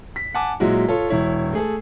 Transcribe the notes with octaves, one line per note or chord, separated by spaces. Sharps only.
B6
F#5 G#5 A5 D6
A#2 F#3 G#3 E4 F#4
F4 A4 C#5
E1 E4 C#5
A3 G#4 A4